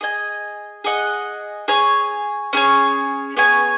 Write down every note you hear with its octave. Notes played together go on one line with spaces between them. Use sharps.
G#4 D#5 G#5
G#4 D#5 F#5
G#4 C#5 G#5
C#4 G#4 C#5
B3 G#4 C#5 G#5